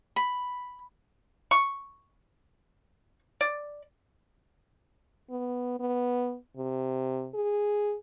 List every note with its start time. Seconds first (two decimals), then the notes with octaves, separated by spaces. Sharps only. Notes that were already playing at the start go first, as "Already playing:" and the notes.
0.16 B5
1.51 C#6
3.41 D5
5.30 B3
5.80 B3
6.57 C3
7.35 G#4